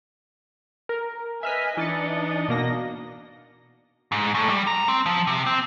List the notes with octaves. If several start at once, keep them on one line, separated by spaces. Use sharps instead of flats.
A#4
B4 D#5 E5 G#5 F6 B6
E3 D4 D#4 D#5 A6 C#7
B2 A#3 A#6
G#2
A2
G3
A#5
C4
F3
C3
C4